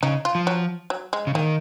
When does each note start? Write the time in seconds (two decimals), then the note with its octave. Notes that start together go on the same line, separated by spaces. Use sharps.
0.03 C#3 D#4
0.25 F4
0.35 F3
0.47 F#3
0.90 F#3
1.13 G#3
1.27 C#3
1.35 D#3 A#3